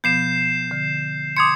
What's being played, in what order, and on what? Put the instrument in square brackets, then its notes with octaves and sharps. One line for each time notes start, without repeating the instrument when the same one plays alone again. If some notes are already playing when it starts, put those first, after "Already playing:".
[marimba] B2 F3 B3 [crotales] G6 C7 E7
[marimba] D3
[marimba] C6 D6 [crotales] D#6 G#6 C#7